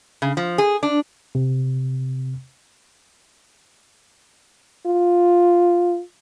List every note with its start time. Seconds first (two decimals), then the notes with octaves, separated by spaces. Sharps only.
0.22 C#3
0.37 F3
0.58 G#4
0.83 D4
1.35 C3
4.86 F4